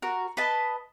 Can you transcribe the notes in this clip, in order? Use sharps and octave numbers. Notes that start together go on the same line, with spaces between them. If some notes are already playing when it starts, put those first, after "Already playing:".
F#4 A#4
B4 D#5 A5